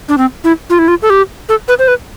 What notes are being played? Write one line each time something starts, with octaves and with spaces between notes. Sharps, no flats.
D4
C4
E4
F4
E4
F4
A4
G4
A4
B4
C5
B4